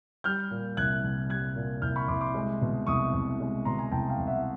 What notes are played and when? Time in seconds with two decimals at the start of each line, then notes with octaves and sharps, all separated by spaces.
0.24 G3 F6 G6
0.51 A#2
0.77 C2 F#6 G#6
1.03 C2
1.30 G3 F#6 G#6
1.56 A#2
1.82 C2 F6 G6
1.96 B5 C#6
2.08 C2 C6 D6
2.21 C6 D6
2.34 G#3
2.61 B2
2.87 C2 C#6 D#6
3.13 C2
3.40 G#3
3.65 B2 A#5 C6
3.79 G#5 A#5
3.91 C2 G5 A5
4.09 F5 G5
4.18 C2
4.27 E5 F#5